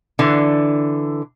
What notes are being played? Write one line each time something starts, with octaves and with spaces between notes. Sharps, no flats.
D3 E3